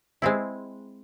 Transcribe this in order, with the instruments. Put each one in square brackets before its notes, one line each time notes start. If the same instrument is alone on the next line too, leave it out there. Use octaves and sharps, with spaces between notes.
[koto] G#3 C4 E4